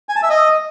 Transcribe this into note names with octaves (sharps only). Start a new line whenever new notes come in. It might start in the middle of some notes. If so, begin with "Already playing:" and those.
G#5
A5
E5
D#5